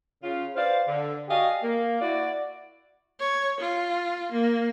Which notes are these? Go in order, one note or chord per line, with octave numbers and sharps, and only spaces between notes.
C#3 F4
B4 C5 D5 F5
D3
F#4 G4 D5 D#5 F5 G#5
A#3
E4 F#4 D5
C#5
F4
A#3